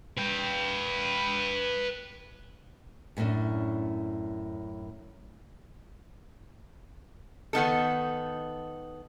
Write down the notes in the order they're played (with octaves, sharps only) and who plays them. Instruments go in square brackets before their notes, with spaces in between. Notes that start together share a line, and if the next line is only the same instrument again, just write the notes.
[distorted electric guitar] B4 G5
[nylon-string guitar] F#2 A2 A#3 C#4 D4
[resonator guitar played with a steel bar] D#3 B3 D#4 A4